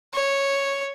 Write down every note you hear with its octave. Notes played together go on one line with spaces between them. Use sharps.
C#5